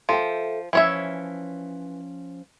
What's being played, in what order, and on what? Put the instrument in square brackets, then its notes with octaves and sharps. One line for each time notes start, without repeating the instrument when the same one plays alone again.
[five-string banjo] F3 [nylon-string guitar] A4 E5 G5
[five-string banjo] E3 C#5 E5 [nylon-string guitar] F3 C#4